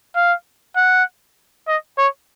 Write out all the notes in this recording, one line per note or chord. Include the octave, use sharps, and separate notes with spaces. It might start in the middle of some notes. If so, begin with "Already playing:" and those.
F5
F#5
D#5
C#5